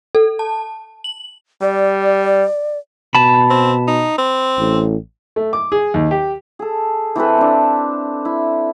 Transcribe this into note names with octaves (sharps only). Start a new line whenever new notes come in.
A4
A5
F#7
G3 D5
B2 A5 B5
C4
D#4
C4
A1
A3
D6
G#4
D#2
G4
G#4 A4
E3 C4 A4 B4
C4 D4
E4